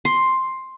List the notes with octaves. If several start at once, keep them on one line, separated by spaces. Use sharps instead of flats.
C6